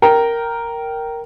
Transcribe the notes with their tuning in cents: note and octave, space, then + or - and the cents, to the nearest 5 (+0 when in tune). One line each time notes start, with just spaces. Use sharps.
A#4 +0 G5 -15